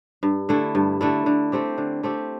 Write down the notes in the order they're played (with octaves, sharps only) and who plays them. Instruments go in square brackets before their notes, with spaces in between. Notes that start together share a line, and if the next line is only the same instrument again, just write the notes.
[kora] G2
D3 A3 E4
G2
D3 A3 E4
D3
A3 C4 G4
D3
A3 C4 G4